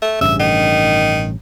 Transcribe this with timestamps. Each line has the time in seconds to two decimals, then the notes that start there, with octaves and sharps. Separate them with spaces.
0.02 A3
0.21 A1 G2 C#3 E5
0.40 D#3